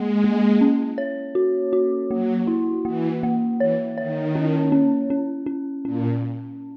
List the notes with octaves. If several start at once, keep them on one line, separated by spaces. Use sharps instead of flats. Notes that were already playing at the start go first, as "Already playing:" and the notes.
Already playing: G#3 A#3
A#3
C#4
C#5
F#4
F#4
F#3 A#3
E4
E3 A#3
A#3
E3 C#5
D#3 C#5
C#4
C#4
C#4
C#4
A#2 C#4